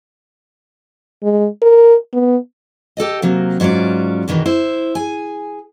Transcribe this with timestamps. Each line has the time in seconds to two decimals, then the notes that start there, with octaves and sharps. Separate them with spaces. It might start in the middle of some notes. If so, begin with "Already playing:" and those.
1.23 G#3
1.62 A#4
2.13 B3
2.97 G4 A4 D5 D#5
3.22 C3 F#3 A#3
3.60 G#2 F#3 C#4 F4 D5
4.28 E2 B2 D#3 E3
4.46 E4 C5
4.95 G#4 G#5